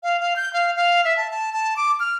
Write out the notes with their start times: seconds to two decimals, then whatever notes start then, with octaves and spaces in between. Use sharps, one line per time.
0.03 F5
0.20 F5
0.36 G6
0.53 F5
0.76 F5
1.05 E5
1.17 A5
1.31 A5
1.53 A5
1.77 D6
2.00 F6